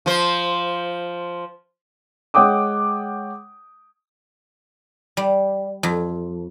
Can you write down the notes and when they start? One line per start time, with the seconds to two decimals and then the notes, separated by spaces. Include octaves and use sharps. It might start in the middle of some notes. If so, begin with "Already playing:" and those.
0.06 F3 C5
2.34 G#3 C#5 F#5 G5 D6 D#6
5.17 G3
5.83 F2